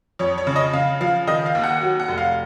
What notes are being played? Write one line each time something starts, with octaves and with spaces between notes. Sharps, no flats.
F2 C#5
C#5
C#3
D#5
C#3 F5
F3 F5
D#3 D#5
F5
D#2
F#5
F#3
F#5
F1
F5